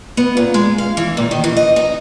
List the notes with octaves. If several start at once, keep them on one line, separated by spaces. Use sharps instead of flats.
B3
A#2
G#3
F5
E3
A#2
D#3
E3
D#5
D#4